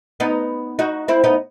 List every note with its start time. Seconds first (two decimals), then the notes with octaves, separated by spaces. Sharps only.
0.20 B3 D#4
0.79 D#4 F#4
1.08 C4 E4
1.24 B3 D#4